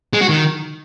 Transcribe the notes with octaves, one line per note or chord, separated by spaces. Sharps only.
G#3
F#4
D#3